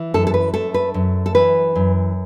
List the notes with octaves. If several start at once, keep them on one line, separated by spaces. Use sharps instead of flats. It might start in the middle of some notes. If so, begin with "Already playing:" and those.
Already playing: E3
F#2 A4
A4
B4
A3 A4
B4
F#2
A4
E3 B4
F#2